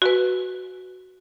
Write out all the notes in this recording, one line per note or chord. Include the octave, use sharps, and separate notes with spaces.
F#4 B4